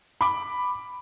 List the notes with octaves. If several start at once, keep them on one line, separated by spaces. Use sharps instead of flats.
B5 D6